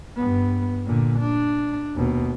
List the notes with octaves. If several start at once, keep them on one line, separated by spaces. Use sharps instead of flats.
G2 B3
A#2 D3
D4
D#2 B2